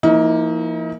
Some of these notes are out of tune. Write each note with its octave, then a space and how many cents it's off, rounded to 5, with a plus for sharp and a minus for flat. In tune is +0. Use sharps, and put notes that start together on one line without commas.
F3 -40 A#3 +5 D#4 +40